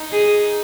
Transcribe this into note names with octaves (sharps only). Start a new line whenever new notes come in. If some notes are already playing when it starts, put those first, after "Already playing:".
Already playing: D#4
G#4